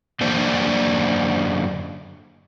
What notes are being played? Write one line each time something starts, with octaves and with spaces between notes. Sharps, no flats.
F#2 D3 A#3 C5 D5